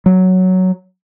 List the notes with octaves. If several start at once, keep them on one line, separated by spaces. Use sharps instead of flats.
F#3